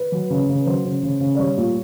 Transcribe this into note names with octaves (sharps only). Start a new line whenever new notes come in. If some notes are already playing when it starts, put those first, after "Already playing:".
Already playing: B4
F#3
C#3
C#3
F#3 C5
C#3
C#3
C#3
D5
G3 C#5
A#2